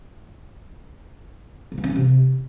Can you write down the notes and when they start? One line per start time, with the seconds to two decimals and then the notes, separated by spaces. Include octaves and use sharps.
1.72 C#3
1.78 E3
1.84 C#4
1.90 E3
1.96 C3